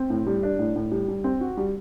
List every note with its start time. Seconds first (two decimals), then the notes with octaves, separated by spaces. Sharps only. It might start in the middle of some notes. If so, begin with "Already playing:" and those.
Already playing: C4
0.10 A2
0.26 G3
0.43 D4
0.59 A2
0.75 A2
0.91 G3
1.08 G3
1.24 C4
1.41 F#4
1.57 G3